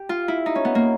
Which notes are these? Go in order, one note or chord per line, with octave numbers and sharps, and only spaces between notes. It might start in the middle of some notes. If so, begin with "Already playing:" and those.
Already playing: G4
F4
E4
D#4
C#4
B3
A#3